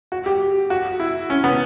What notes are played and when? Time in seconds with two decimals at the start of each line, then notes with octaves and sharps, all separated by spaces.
0.12 F#4
0.26 G4
0.70 F#4
1.00 E4
1.30 C#4
1.44 B3